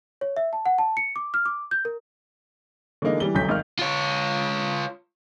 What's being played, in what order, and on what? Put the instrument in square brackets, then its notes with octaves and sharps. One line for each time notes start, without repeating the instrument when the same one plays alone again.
[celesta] C#5
E5
A5
F#5
A5
C#7
D6
F6
D6
G6
A#4
[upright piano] D3 E3 G#3 A#3 D#4
E3 G3 G7
D#1 A1 D2 F#3 G6 B6
G#1 D#3 F6
[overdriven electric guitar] F4 C#5